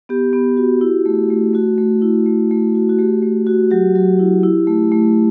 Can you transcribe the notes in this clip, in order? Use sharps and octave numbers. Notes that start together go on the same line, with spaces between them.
B3 G4
B3
F#4
E4
A3
A3
A3 F#4
A3
E4
A3
A3
F#4
F#4
A3 G4
A3
F#4
F#3 G4
F#3
E4
E4
A3
A3